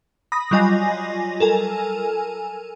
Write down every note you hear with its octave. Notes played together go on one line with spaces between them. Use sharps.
B5 D#6 A#6
F#3 G3 F4 D#5 G#5 A#6
A4 A#4 G#5